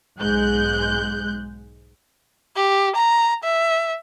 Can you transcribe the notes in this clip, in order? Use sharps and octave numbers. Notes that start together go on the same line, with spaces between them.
B1 G#2 G#3 F#6 G6
G4
A#5
E5